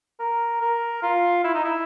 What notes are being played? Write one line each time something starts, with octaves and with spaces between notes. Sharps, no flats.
A#4
A#4
F4
E4
D#4
E4